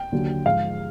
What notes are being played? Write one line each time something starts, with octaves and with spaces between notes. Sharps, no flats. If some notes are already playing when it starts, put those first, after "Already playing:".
Already playing: G5
D#2 D3 F#3
G#2 F3 G#3 F5